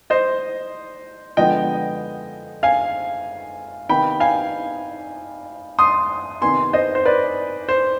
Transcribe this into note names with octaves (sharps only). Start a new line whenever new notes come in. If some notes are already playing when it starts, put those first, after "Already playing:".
C5 D#5
D3 F3 G#3 B3 D#5 G5
F5 G#5
C3 D#3 B3 G5 B5
F5 G#5
C6 D#6
C3 D#3 B3 G#5 C6
C5 D#5
C5
B4 D5
C5